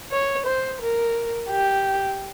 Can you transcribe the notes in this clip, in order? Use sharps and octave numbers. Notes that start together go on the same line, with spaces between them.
C#5
C5
A#4
G4